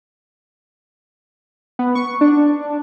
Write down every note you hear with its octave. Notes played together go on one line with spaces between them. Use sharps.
B3
C#6
D4